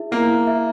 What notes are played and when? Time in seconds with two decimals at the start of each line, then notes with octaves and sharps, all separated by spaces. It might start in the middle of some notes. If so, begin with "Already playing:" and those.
Already playing: E4 G#4 E5
0.11 A#3 E4
0.30 E4
0.47 E5